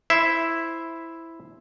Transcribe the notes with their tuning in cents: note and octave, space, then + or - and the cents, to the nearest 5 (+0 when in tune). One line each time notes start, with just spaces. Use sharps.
E4 +0 C5 +0 E5 +0